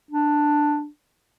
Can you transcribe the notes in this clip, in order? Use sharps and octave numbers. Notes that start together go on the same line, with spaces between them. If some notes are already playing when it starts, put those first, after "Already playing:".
D4